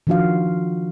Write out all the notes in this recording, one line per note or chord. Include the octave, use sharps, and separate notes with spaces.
D#3 F3 D4 F4 F#4 F5